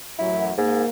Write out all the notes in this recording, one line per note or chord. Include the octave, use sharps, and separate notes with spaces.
A1 F#2 F#3 E4
G#2 A#3